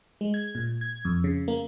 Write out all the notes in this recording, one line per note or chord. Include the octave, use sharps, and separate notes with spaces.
G#3
G#6
A#2
G#6
F2
C#3
A#3